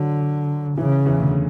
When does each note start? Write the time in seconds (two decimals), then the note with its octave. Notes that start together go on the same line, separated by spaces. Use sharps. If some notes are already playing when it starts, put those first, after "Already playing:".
Already playing: D3 F#3 F#4
0.78 C#3 E3 E4
1.05 E2 E3
1.19 D2 D3